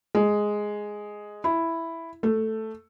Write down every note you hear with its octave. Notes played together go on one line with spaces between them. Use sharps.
G#3
E4
A3